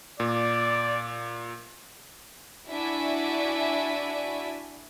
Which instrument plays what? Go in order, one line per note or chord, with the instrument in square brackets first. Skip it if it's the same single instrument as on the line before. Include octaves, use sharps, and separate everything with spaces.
[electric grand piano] A#2 [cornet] D5
[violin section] D4 E4 F#4 D5 E5 G#5